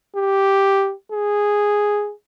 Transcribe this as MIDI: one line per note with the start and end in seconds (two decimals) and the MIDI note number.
0.16 0.93 67
1.12 2.11 68